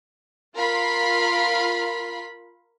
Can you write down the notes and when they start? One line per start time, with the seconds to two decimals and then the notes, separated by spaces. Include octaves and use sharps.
0.55 F4 A#4 F5 B5 C6